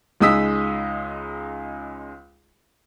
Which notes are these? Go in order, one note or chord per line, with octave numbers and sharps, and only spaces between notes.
C#2 G#3 D#4 D#6 E6 B6